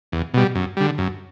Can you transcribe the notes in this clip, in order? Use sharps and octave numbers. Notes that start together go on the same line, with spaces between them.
E2
B2 G3
F#2
D3 G3
F#2